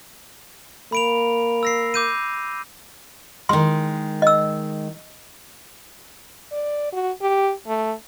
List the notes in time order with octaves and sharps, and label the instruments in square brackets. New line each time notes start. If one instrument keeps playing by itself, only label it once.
[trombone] A#3 [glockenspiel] B5 D7 F7
[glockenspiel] E6 A#6 C7
D6 G6 D#7
[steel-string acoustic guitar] D#3 G#3 [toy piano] C6
[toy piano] D#5 E6
[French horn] D5
F#4
G4
A3